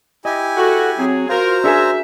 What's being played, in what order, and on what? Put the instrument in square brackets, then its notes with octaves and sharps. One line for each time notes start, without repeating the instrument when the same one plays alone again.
[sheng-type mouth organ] E4 G4 G#5 [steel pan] D#5
[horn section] F#4 [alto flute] A4
[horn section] F#3 G#4 [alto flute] C4
[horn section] F4 A#4 [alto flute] F#4 [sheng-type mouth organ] C5 A#5
[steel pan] D4 G#4 A#4 [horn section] E5